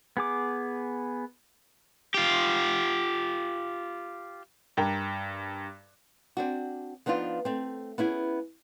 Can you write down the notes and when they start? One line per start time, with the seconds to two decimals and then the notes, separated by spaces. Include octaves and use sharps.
0.17 B3 G#4 D6
2.14 F4 G4
4.77 G2 A#4 G5
6.37 C4 D4 F#4
7.06 F3 B3 D4 D#4 F4
7.45 A3 C4
7.98 B3 C#4 E4 G#4